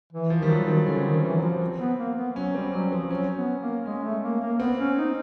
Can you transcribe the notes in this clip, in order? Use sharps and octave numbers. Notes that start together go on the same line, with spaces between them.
E3
F3
D#3
G3
F#3
D#3
C4
D3 C#4
D#3
E3
F#3
F3
C4
B3
A#3
B3
F#3 C#4
G3 C4
F#3 C#4
F3 C4
F#3 C#4
B3
A#3
G#3 C#4
A3
A#3
A#3
B3 C4
C#4
D#4